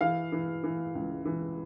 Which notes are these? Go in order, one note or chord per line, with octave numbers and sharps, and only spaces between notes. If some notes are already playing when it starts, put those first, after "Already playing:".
E3 F5
E3
E3
C#2
E3